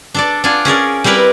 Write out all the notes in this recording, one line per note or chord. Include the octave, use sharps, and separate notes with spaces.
D4 A4 D5
D4 F4 F#5 G#5
C#4 G#4 A#4 D5
G3 C4 E4 A#4 B4